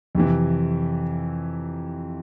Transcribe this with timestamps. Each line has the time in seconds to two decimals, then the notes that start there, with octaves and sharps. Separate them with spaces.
0.15 F2 C3 E3